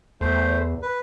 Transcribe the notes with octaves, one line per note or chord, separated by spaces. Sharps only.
E2 A3 C5
B4